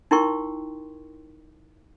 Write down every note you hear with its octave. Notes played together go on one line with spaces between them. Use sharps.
D#4 E4 A#4 G5 C6 C#6